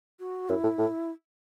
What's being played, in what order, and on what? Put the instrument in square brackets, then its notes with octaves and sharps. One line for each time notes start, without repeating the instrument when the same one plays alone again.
[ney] F#4
[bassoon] F#2 [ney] E4
[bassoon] A2
A2